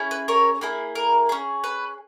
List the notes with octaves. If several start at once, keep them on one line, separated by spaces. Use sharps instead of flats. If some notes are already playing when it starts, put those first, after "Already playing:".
Already playing: C#4 E4 G#4
B4
A#4 C#5
A#3 E4 G#4
A#4
C#4 G#4
B4